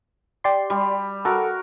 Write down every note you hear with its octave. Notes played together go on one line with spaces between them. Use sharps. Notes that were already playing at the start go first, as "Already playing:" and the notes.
G4 D5 C6
G3
F#4 A4 A#4